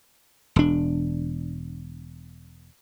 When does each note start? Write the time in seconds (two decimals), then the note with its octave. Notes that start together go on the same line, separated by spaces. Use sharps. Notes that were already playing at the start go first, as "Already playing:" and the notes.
0.56 E1 D4